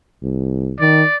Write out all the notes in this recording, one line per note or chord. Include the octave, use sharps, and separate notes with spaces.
C2
D#3 D5